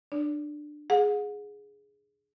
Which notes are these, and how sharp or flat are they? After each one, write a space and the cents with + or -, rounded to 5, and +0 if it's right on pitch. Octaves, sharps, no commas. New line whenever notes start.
D4 +20 D5 -35
G#4 +0 F#5 -35